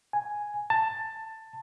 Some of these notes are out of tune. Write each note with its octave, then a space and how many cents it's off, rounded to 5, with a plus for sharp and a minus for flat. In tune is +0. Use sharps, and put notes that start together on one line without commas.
G#5 +0
A5 +15